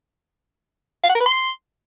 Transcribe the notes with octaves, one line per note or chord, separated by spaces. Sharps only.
F5
F#5
A#4
B4
C6